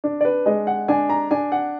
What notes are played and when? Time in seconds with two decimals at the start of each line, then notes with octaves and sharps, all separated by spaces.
0.04 D4
0.21 D5
0.25 B4
0.46 G#3 D#5
0.67 F#5
0.88 D4 G#5
1.09 A#5
1.31 D4 G#5
1.52 F#5